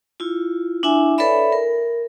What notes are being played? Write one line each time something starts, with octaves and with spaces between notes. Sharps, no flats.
E4 F4
D4 E4 E5 G#5
A4 B4 C#5 D5 E5 B5
A#4